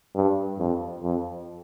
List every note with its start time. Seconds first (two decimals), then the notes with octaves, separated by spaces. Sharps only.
0.15 G2
0.59 F2
1.03 F2